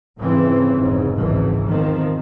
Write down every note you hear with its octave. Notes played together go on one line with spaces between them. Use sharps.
F2 G#2 C#3 E3 C4
F1 G#2 C#3
G#1 C#2 G#2 E3
E2 D#3 F3 C4